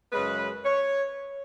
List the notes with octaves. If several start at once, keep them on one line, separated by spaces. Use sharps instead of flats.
F#2 C#3 G#3 B4
C#5